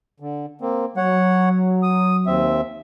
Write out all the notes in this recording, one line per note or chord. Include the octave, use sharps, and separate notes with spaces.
D3
A#3 C4
F#3 C#5 F#5
D#6
D#2 C4 E5